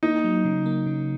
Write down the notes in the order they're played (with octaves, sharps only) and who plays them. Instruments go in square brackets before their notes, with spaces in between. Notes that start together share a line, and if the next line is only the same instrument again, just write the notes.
[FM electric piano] A#3 [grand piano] D#4
[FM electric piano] F#3
C#3
A#3
C#3